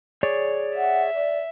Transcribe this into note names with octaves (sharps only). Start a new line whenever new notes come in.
G#4 C#5 D5
E5 F#5
D5